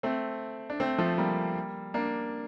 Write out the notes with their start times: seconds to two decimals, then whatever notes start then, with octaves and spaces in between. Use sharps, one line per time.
0.03 A3 C4
0.70 D4
0.80 A3 C4
0.98 F3 A3
1.18 G3 A#3
1.94 A#3 D4